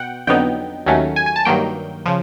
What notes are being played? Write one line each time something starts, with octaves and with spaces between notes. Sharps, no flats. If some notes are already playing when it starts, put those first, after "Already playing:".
Already playing: B2 F#5 G5
F2 D3 F#3 B3 D#4 G5
D#2 D#3 F#3 A3 C#4
G#5
G#5
A5
G2 D#3 F#3 A#3 G5
C#3 F3